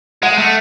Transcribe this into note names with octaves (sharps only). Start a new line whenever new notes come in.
G#3 F#5
A3